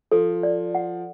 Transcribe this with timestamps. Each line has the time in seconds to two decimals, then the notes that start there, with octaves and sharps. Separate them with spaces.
0.11 F3 A4
0.43 D5
0.75 F#5